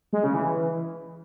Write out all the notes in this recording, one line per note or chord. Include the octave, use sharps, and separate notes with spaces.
G#3
C#3
E3